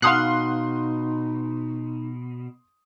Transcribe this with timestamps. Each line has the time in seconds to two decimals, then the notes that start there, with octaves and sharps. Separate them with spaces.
0.02 B2 D#4 F5 F#5 C6 D#6 F#6 C7